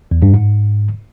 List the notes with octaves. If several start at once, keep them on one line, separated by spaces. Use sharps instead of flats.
E2
G2
G#2